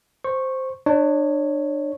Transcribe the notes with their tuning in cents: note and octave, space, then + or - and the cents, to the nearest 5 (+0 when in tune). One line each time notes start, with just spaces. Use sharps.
C5 +0 C#6 -15
D4 +30 C#5 -5